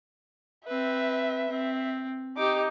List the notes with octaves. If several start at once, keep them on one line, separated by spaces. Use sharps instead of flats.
C4 B4 E5
C4
D#4 G4 D6